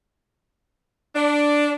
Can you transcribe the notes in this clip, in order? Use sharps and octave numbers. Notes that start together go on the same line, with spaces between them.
D4